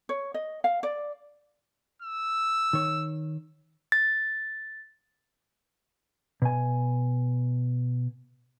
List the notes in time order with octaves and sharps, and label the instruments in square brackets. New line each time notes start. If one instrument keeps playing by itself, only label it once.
[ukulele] C#5
D#5
F5
D5
[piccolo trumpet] E6
[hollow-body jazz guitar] D#3 C#5
[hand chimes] A6
[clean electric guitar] B2 G#5